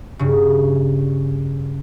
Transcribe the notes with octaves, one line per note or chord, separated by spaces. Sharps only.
G2 C#3